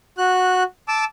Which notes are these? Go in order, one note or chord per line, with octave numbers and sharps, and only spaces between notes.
F#4 F#6
A5 D6 E6